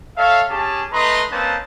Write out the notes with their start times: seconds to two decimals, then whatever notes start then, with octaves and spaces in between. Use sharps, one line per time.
0.18 A4 C#5 E5 F5
0.50 C#4 G4 G#4 A5
0.92 A3 D#4 B4 D#5 A#5 C6
1.31 A#3 C4 C#4 D#4 B4 A5